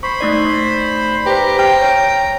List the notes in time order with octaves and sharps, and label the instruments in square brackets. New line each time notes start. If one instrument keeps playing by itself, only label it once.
[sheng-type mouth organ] C5 B5 [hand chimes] C#6
[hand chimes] A3 D#4 D5
[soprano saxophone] G4 [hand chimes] B4 C5 [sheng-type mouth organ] A#5
[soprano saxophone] G5 [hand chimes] F6
[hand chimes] C#5